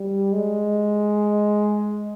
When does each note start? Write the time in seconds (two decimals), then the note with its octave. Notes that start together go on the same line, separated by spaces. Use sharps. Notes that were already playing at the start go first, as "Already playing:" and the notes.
Already playing: G3
0.33 G#3